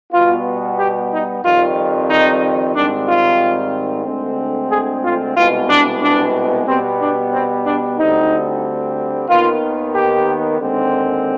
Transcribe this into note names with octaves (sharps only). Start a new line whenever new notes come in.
B2 G3 B3 F4
G4
D#4
F2 D#3 G3 C4 F4
D#4
G#2 D#3 G3 C4 D4
F4
D2 D3 G#3 C4
G#4
F4
C2 B2 G#3 B3 F4
D4
D4
B2 G3 B3 C4
D4
C4
D4
D2 D3 G3 C4 D#4
D#2 D#3 B3 F4
G4
D#2 D3 G#3 C4